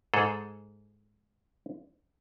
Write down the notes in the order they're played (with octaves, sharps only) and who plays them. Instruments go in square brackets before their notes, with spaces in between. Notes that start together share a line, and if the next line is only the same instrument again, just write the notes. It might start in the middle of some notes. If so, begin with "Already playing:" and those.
[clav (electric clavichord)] G#2 G#4 A4